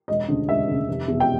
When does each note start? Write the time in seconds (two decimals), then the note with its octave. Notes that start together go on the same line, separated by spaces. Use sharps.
0.08 E1 D#5
0.28 D2 C#3
0.48 E1 E5
0.67 D2 C#3
0.88 F1
1.08 E2 B2
1.20 G5